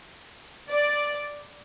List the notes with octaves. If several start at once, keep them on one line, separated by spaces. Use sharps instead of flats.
D5